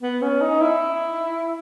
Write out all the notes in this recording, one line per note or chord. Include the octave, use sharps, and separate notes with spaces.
B3
C#4
D#4
E4